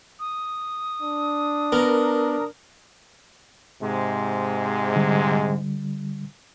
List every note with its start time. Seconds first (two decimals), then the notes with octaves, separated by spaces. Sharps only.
0.20 D#6
1.02 D4
1.72 B3 A#4
3.82 G#2 C3 G#3
4.96 D3 G3